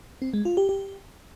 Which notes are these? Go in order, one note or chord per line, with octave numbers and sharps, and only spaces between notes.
C4
G#3
F4
G4
G4